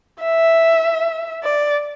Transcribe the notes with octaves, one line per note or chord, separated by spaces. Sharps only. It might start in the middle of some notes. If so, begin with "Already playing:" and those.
E5
D5